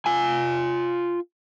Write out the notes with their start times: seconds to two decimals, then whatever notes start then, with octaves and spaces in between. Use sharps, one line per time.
0.06 F4 G#5